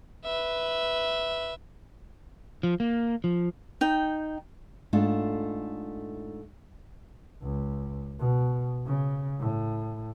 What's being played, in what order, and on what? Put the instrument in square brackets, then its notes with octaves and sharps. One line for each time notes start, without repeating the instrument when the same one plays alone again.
[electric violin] B4 E5
[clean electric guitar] F3
A#3
F3
[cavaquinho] D#4 G5
[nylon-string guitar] G#2 A3 D4 F4
[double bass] C#2
B2
C#3
A2